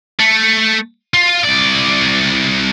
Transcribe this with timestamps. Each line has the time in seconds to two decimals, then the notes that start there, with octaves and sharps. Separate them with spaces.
0.20 A3
1.14 F4
1.43 C2 D5